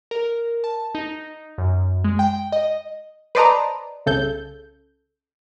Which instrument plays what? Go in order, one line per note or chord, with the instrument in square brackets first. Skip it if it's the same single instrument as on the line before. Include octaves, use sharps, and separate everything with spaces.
[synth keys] A#4
A5
D#4
F#2
G#3
G5
D#5
[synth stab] B4 C5 D5 D#5 A5 A#5
C2 C#3 A4 G6